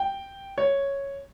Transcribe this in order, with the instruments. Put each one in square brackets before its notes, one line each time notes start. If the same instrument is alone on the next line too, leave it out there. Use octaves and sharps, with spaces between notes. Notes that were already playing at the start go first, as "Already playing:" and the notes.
Already playing: [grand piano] G5
C#5